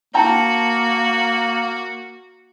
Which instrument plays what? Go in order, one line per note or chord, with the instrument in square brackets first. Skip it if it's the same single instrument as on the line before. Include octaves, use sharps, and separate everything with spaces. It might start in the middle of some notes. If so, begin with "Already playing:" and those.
[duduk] A#3 [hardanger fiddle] F#4 [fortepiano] G5 A5 A#5